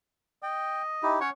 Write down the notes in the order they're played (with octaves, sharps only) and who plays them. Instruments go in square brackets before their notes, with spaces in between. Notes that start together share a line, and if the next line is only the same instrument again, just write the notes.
[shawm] D#5 [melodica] G5
[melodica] D#4 E4 G4
[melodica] C#4 F#5 C#6 [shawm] C#5